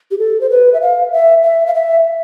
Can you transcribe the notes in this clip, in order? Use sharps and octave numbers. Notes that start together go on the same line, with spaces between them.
G4
A4
C5
B4
E5
F5
E5
E5
F5
E5